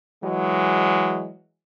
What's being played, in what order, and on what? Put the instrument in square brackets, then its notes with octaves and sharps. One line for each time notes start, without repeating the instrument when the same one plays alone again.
[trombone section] E3 F#3 G#3